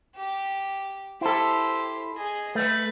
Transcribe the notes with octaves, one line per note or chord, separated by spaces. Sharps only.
G4
E4 G4 A4 C5
G#4 D#5
A3 B4